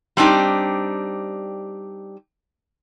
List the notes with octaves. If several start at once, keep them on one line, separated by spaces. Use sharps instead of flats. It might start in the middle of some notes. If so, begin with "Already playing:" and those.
G3 C4 D4 D#4 G4